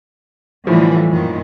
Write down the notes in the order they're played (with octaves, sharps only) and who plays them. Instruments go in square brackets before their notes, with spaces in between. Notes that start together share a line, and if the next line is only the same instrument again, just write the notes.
[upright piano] A2 F3 [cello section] D3 E3 G3
[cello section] F#2 A#2 D#3